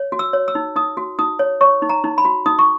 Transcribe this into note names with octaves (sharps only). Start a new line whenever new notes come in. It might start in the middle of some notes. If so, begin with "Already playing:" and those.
Already playing: C#5
F#4
E6
C#5
E6
D#4
D#4 D#6
F#4
D#4 D#6
C#5
C#5 C#6
D#4
A#5
D#4
B5
F#4
D#4 D#6
C#6